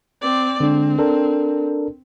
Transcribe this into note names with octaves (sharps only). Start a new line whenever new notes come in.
C4 D5
D3 G#3 C4 D4
D4 A4 A#4